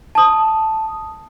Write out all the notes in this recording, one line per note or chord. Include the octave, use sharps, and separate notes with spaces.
A5 D#6